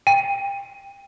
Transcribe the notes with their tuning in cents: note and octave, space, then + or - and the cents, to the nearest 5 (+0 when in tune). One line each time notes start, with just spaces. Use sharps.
G5 +20